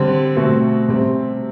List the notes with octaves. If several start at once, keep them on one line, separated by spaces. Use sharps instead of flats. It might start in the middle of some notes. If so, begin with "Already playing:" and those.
Already playing: D3 G3 C4
B2 A3 C4 F#4
C3 G3 C4